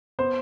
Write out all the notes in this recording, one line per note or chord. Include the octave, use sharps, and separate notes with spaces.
B3 C5